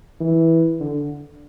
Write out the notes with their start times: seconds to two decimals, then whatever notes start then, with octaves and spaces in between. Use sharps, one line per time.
0.20 E3
0.80 D3